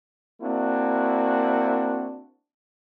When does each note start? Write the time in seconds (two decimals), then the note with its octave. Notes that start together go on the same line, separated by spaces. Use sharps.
0.41 A#3 C4 D4 E4 F#4